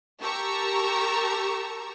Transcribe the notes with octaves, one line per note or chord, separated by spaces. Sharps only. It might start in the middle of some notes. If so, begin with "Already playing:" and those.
G4 A#4 A5 A#5 C#6 E6